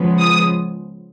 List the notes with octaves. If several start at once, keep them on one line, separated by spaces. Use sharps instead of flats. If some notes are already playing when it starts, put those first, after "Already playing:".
Already playing: C#3 F3 G#3 B3
D#6